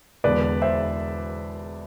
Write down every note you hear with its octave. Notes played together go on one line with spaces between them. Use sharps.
E1 E2 D3 B4 D5
C5 E5